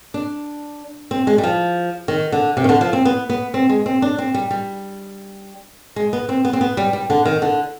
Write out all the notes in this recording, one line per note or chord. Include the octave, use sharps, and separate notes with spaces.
D4
C4
G#3
G3
F3
D#3
D3
C3
D#3
D3
F3
C4
B3
B3
C4
G#3
C4
D4
C4
G3
G3
G#3
B3
C4
B3
C4
B3
G3
G3
D3
D#3
D3